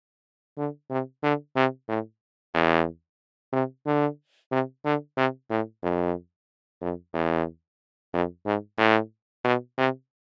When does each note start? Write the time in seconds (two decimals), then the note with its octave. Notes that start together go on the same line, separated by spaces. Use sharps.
0.58 D3
0.90 C3
1.23 D3
1.56 C3
1.89 A2
2.54 E2
3.53 C3
3.86 D3
4.51 C3
4.85 D3
5.17 C3
5.50 A2
5.83 F2
6.82 F2
7.14 E2
8.14 F2
8.46 G#2
8.78 A2
9.44 B2
9.78 C3